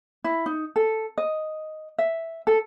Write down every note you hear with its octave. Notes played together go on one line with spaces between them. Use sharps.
E4
D#4
A4
D#5
E5
A4